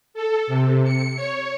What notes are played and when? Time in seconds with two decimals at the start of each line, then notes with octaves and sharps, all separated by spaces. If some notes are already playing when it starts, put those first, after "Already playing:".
0.14 A4
0.47 C3
0.84 C#7
1.16 C#5